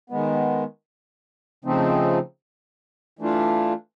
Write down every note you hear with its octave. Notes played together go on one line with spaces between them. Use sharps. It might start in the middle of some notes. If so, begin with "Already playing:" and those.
D#3 G#3 B3
C#3 F3 A3 C4 D#4
E3 A3 D4 F4